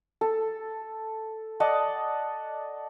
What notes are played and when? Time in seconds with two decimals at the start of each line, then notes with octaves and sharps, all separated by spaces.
0.21 A4
1.60 D5 D#5 F#5 A5